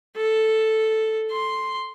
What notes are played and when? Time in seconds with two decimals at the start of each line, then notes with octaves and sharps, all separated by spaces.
0.17 A4
1.31 C6